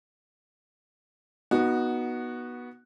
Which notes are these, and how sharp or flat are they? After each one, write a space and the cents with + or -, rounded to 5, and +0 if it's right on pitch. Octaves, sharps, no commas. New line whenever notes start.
B3 -20 D#4 +0 F#4 +0